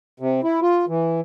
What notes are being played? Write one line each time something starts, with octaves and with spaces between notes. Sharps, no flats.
C3
E4
F4
E3